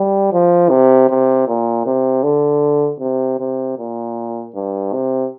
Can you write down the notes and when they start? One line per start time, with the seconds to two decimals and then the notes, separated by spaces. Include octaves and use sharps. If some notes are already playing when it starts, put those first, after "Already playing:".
Already playing: G3
0.32 F3
0.70 C3
1.09 C3
1.47 A#2
1.86 C3
2.23 D3
3.00 C3
3.39 C3
3.78 A#2
4.55 G2
4.93 C3